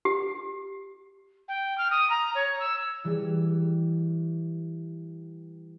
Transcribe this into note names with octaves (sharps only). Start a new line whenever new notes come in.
G4
G5
F6
D#6
A#5
C#5
E6
E3 G3